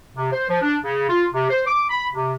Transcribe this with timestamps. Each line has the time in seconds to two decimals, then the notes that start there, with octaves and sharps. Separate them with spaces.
0.16 C3
0.32 C5
0.50 F3
0.62 D4
0.83 C#3
1.09 F4
1.34 C3
1.49 C5
1.67 D6
1.89 B5
2.14 C3